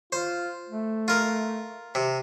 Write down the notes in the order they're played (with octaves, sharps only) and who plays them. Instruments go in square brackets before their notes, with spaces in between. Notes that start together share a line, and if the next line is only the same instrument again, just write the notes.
[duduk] F4 [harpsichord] C5
[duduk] A3
[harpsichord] F4 A#4
C3